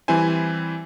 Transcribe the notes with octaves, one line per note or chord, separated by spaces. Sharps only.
E3 G3 C4 E4 C5 G#5